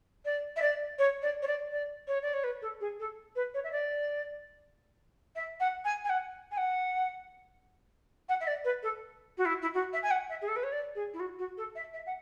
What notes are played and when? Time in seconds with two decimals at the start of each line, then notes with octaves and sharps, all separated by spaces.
0.25 D5
0.56 E5
0.62 D5
0.99 C#5
1.22 D5
1.42 C#5
1.47 D5
1.71 D5
2.07 C#5
2.22 D5
2.33 C#5
2.44 B4
2.62 A4
2.80 G#4
2.99 A4
3.35 B4
3.54 C#5
3.64 E5
3.72 D5
5.35 E5
5.60 F#5
5.85 G#5
6.04 G#5
6.09 F#5
6.51 G#5
6.57 F#5
8.29 F#5
8.40 E5
8.47 D5
8.64 B4
8.83 A4
9.38 F#4
9.45 E4
9.62 E4
9.74 F#4
9.93 E5
10.03 G#5
10.10 F#5
10.29 E5
10.42 G#4
10.48 A4
10.56 B4
10.63 C#5
10.72 D5
10.95 G#4
11.13 E4
11.19 F#4
11.39 F#4
11.57 A4
11.75 E5
11.93 E5
12.06 F#5